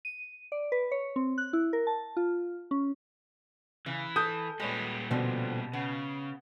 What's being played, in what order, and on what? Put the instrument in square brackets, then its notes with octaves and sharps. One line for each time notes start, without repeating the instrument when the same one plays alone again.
[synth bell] D#7
D5
B4
C#5
C4
F#6
E4
A#4
A5
F4
C#4
[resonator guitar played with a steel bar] C#3 [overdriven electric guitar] E3
[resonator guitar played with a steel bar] A4 [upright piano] D#6 G6
[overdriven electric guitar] A#2 G3 [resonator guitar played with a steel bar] G#3 B4 C#5
[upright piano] B2 [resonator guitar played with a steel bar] D3 F3 C4
[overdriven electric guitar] C#3 [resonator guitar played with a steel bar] B3